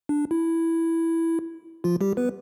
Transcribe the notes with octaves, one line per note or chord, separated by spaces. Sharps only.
D4
E4
F3 F4
G3 G4
B3 B4